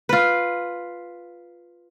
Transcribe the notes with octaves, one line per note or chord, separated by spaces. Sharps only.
F4 B4